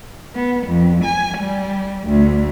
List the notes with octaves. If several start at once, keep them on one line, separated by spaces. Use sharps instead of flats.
B3
F2
G#5
G3
D2